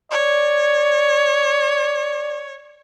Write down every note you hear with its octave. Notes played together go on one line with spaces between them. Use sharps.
C#5 D5